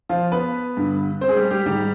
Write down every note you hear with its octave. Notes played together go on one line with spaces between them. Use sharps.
F3 F4
B3 B4
G2 D3
C4 C5
G#4
G3 G4
G3 G4
G#2 D#3 G3 G4